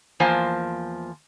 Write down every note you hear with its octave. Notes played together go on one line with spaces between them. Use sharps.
E2 F3 A#3 C5 G#5 A5